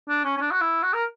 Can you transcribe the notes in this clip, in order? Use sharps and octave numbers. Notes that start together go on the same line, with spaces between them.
D4
C#4
C#4
D4
F#4
E4
F#4
A#4